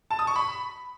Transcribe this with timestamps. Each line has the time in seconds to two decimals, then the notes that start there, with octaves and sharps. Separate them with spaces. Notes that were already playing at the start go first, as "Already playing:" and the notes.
0.11 A5
0.19 D#6
0.27 C#6
0.36 B5